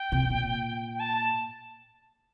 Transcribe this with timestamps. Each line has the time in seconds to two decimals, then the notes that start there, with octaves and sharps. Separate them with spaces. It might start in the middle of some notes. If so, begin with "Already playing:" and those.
Already playing: G5
0.12 C3
0.30 A#2
0.95 G5
1.00 A5
1.17 A5